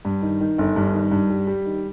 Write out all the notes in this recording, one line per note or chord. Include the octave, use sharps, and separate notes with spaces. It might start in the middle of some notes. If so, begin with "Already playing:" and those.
G2
D#3
D#3
G1
G2
D#3
G2
G3
G3
D#3